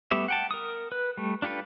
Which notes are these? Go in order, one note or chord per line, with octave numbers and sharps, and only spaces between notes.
G3 A3 B3 G4 E5
F#5 G5 A5
A#4 D#6
B4
G3 A3
D4 F4 G4 A4 B4